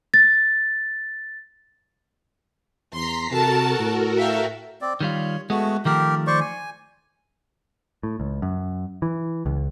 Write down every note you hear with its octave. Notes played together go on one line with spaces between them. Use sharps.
A6
E2 A#5 C6 B6 C7
C3 F#4 A4 A#4 A5
A2
E5 F5 G5
C4 D5
D#3 G3 F4 C#5
G#3 A3 B3 F#4
D#3 F3 A3 G4 A#4
C5 D5 C#6
G#5
A2
C#2
F#2
E3
C#2